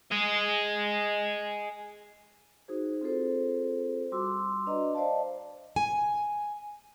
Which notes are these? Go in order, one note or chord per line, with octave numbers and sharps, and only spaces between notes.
G#4 D#5
D#4 F#4 G#4 C5
C4 F4 G#4 A4 C5
G3 F#4 C6 D6 E6
D4 B4 D5 D#5 A#5
C5 D5 D#5 F5 A5
G#5